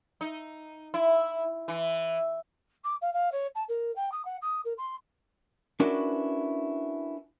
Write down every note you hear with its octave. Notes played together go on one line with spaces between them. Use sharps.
D#4
E4
E3
D6
F5
F5
C#5
A5
A#4
G5
D#6
F#5
D#6
A#4
C6
C#4 D4 E4 F#4 A#4 B4